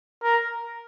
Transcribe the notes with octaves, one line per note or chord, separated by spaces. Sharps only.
A#4